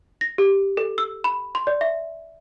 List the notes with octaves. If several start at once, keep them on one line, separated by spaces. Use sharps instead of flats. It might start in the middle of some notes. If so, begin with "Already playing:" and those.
A#6
G4
A4
E6
B5
C6
D5
E5